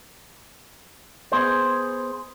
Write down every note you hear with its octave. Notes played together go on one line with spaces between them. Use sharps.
B3 G#4 C5